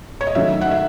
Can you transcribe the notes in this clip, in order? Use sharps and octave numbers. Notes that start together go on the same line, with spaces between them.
C#5
D#5
D#3 F#3 A3 D#4 E5
F#5
E5